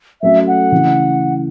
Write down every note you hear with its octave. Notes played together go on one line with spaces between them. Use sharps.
F#3 A3 C#4 A4 E5
F#5
C#3 E3 A3